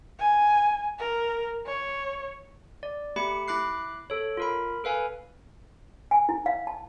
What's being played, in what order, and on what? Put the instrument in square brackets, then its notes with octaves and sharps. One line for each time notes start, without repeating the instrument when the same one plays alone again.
[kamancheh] G#5
A#4
C#5
[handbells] D5
A3 G4 B5 C#7
E4 B5 D6 F#6 C7
A4 C#5
F4 A#4 B5
A4 B4 F5 G#5
[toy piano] G#5
E4
F5
A5